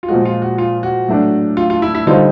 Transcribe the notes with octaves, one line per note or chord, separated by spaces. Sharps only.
F4
A#2 F3 G#3 F#4
F4
F#4
F4
F#4
A2 F#3 A3 D4
F4
F4
E4
E4
D3 G3 C4 D#4 F4